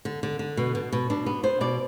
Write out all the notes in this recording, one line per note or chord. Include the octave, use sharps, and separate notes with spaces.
D3
D3
D3
B2
B2
B2
B2 D4
B3
B3 C5
B2 D5